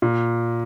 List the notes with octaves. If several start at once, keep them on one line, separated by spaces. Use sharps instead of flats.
A#2